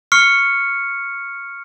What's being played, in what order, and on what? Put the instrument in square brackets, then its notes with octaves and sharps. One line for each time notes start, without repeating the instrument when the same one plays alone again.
[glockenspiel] C#6 F6 C7 C#7